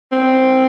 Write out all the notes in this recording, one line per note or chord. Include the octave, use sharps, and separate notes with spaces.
C4